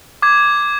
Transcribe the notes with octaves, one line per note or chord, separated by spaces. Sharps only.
D6 G#6